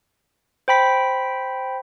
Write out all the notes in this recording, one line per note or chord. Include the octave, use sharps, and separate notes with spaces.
C5 G5 B5 B6